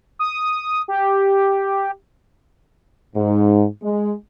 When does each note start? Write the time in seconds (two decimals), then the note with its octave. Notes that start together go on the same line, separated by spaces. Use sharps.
0.19 D#6
0.88 G4
3.16 G#2
3.83 G#3